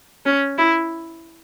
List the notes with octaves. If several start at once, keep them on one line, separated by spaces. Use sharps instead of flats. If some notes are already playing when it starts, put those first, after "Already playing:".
C#4
E4